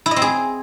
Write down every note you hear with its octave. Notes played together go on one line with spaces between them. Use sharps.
E4
D#5
C4
G#4